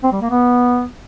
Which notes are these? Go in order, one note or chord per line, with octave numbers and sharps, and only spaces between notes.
C4
G3
A#3
B3